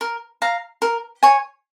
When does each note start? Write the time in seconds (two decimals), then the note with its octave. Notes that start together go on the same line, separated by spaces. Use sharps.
0.01 A#4
0.42 F5 A#5
0.82 A#4
1.23 C#5 G#5